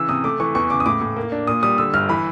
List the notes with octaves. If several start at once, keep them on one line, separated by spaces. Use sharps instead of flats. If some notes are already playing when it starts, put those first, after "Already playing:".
Already playing: C#3 E3 E6
C3 D#6
A3 D6
E3 C#6
E2 C#6
C#3 D6
D#6
A2 D6
A2
A#3
D4
A#2 D#6
G3 D#6
D3 E6
G1 F6
E3 B5